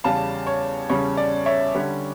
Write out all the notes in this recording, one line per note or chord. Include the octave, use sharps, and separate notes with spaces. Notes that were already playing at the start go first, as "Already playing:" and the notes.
E2 C#3 G3 C#4 F5 A5
C#5
E2 C#3 G3 C#4 C#5
D5
C#5 E5
D3 G3 C#4